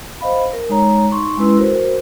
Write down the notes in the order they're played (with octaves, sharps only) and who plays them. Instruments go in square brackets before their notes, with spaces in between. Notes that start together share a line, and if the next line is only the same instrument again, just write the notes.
[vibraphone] C5 D#5 F5 B5
A#4
G#3 D#4 C#5 A#5
D#4 C6 C#6
G#3 C#4 E4 B4 C6 E6
F#4 A#4 C5